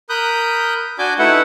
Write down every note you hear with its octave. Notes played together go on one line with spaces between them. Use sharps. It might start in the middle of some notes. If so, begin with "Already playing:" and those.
A#4 B5 D#6 F#6 G6
D4 F#4 D5 G#5 D6 G6
A3 D#4 E4 B4 E5 F#5